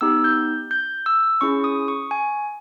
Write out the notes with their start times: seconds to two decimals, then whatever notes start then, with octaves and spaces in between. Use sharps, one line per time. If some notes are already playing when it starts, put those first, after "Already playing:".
0.01 B3 D#4 G4 E6
0.24 G6
0.71 G6
1.06 E6
1.41 C#4 E4 G#4 C#6
1.64 D#6
1.88 C#6
2.11 G#5